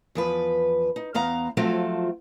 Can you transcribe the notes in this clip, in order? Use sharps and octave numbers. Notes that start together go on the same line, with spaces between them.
E2 F3 B4
D#4
E2 B3 F5 A#5
F3 F#3 A3 C4 F4